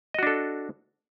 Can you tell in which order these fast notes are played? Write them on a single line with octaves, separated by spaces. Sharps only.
D#5 F#4 D4 A4